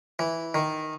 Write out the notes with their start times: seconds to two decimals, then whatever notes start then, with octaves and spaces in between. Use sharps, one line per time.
0.19 E3
0.54 D#3